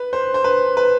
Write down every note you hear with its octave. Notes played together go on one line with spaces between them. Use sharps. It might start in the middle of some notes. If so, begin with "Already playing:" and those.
Already playing: B4
C5
C5
B4
B4